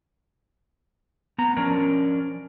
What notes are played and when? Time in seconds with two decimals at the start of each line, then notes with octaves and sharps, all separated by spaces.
1.38 B3 A#5
1.57 F3 C#4 D4 A#4